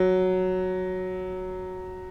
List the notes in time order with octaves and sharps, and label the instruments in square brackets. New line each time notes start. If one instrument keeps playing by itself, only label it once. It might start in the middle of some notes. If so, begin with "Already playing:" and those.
Already playing: [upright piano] F#3